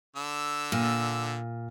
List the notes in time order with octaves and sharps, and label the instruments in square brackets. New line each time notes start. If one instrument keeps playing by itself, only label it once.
[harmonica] D3 E6
[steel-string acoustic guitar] A#2